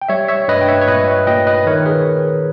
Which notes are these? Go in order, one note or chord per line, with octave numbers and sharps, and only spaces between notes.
G5
G3 C#5 E5
C#5 E5
G2 B4 D#5
G5
C#5 E5
C#5
A#2 B4 D#5
C#5 E5
A#2 D#5 G5
B4 D#5
D#3 A#4 C#5
G#4 B4